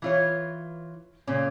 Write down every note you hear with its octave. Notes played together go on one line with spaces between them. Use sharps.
E3 F4 C#5
A#2 C#3 C#4